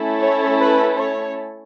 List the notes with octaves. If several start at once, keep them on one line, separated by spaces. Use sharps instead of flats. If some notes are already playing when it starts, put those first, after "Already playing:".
Already playing: A3 C#4 E4 A4
C#5
B4
C#5